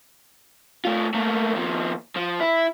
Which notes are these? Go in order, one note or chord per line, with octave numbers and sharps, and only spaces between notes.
A3 F4
A3 A#3
D#2 F3
F3
E4